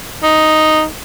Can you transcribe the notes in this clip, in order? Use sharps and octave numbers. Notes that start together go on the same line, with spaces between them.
D#4